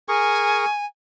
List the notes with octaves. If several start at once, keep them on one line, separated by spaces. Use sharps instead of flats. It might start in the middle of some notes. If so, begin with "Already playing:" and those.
G#4 A#4 G#5 C#6